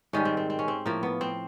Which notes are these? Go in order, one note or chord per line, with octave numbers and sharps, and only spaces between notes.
G#2 D#3 G3 C#4
C4
C4
C4
C#4
C4
A2 F3 A#3
B3
C4